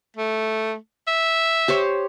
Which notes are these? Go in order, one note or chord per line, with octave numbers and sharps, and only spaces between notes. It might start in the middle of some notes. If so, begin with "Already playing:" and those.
A3
E5
G4 C5 C#5